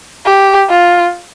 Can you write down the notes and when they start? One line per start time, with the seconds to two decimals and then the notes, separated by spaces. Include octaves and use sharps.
0.26 G4
0.70 F4